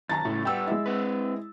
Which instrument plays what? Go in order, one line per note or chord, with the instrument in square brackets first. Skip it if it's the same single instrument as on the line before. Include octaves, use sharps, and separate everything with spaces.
[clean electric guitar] F#2 D#3 [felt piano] A5 A#5 A6
[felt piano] A2 [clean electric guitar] C#3 A3
[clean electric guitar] G3 B3 [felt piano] G5 E6
[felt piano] G#3 E4
[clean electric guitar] C4 B4